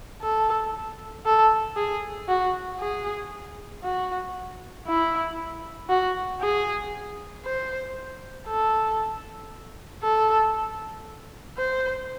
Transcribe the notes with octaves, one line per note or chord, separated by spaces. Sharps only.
A4
A4
G#4
F#4
G#4
F#4
E4
F#4
G#4
C5
A4
A4
C5